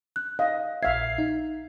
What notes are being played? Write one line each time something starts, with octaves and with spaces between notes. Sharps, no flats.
F#6
D#5 F5
A#1 E5 F5 G#6 C7
D#4